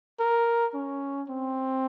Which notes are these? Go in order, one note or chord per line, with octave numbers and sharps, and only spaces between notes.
A#4
C#4
C4